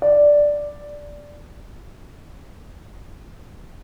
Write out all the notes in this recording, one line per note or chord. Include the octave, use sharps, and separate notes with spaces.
D5